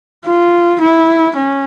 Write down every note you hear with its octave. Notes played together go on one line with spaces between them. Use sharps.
F4
E4
C#4